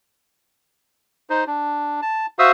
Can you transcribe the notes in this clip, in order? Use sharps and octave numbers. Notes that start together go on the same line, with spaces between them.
D#4 C5
D4
A5
F#4 C5 E5 F5 D#6 E6